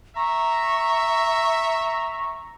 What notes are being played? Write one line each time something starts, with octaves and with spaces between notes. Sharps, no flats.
E5 A#5 C#6